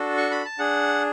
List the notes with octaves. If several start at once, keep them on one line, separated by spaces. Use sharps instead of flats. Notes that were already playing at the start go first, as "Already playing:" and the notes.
Already playing: D4 F#4 A4
C#6
B5
A5
D4 G#4 F#5